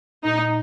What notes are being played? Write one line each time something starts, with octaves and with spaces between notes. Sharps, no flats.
A#2 D#4